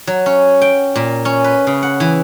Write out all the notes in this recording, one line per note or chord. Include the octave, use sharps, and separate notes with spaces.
F#3
C#4
G5
A#2
C#4
B4
C#3
F#5
E3